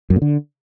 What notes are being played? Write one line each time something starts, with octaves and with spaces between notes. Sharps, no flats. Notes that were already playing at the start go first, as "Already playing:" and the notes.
F#2
A#2
D3